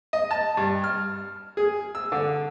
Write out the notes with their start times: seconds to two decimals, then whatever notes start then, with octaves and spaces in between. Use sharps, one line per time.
0.13 D#5
0.31 A5
0.57 G2
0.84 F6
1.57 G#4
1.95 E6
2.12 D3